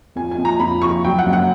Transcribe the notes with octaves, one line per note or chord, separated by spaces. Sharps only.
F2 G#5
G#5
F2
A#5
F2 B5
F3 C#6
F#3 G5
F#5
F#2
F#5